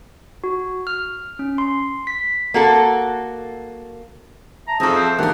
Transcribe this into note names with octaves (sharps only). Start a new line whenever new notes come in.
F#4
F6
C#4
C6
B6
A#3 F#4 A4
E5 A5 A#5
F2 C4 G#4 A4 D#5
C5
D3 D#3 A#3 G4 A#4 F#5